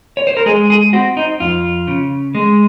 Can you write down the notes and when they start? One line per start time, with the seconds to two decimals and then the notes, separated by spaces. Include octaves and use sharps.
0.17 C#5
0.27 C5
0.37 A#4
0.46 G#3 G#4
0.70 G#4
0.93 C4 F#4
1.17 D#4
1.40 F2 F4
1.88 C#3
2.35 G#3